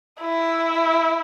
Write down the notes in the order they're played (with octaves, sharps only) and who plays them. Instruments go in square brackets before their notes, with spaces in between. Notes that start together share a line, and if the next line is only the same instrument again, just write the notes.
[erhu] E4